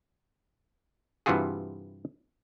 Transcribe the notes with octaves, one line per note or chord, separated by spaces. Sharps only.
G2 C3 E3 F4 F#4 G#4